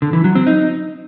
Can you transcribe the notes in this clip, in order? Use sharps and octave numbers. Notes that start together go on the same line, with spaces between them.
D3
E3
F#3
C4
D#4